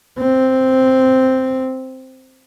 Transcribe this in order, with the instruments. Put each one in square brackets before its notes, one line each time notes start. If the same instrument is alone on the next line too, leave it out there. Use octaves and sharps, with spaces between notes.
[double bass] C4